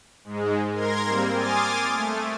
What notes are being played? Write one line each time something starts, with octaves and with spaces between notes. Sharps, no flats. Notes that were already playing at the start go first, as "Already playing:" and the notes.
G#2 G#3
A#4 C6 G#6 A#6
G3 A#3 C4
G#5 C6 D6 D#6 F6 A6
A3